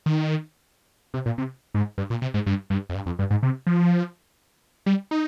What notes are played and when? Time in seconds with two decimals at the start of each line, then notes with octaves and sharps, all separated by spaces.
0.06 D#3
1.14 C3
1.26 A#2
1.38 C3
1.74 G#2
1.98 G2
2.10 A#2
2.22 C3
2.34 G#2
2.46 G2
2.70 G2
2.90 F2
2.95 G2
3.06 F2
3.19 G2
3.31 G#2
3.43 C3
3.67 F3
4.86 G3
5.11 D#4